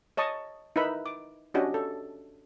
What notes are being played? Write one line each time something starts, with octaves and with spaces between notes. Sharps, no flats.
C#5 D#5 A5 C#6 D#6
D#4 E4 A#4 B4 E5 B5
D6
C#4 D4 F#4 G4 D#5
A4